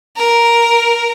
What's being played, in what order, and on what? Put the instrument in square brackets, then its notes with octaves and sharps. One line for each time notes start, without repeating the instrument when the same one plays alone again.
[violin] A#4